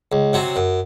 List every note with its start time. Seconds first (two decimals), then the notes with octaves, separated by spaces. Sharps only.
0.12 C#2
0.33 C3 F#3 C4
0.56 F#2